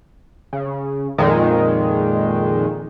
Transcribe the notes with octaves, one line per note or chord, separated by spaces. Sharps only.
C#3
F2 A#2 D#3 G#3